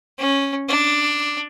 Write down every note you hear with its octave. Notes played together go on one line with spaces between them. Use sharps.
C#4
D4